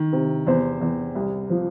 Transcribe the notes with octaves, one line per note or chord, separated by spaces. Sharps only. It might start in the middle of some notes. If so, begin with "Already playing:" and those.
Already playing: D#3
C3
E2 C5
E2
C2
F3